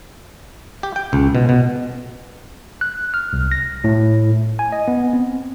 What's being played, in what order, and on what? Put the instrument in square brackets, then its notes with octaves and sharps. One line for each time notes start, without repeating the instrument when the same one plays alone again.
[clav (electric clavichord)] G4
G5
C#2
B2
B2
[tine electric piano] F#6
F6
C2
A#6
A2
G#5
D#5
B3
C4